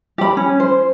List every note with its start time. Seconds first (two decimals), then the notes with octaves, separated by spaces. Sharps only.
0.18 G4 B5
0.37 C#4
0.60 C5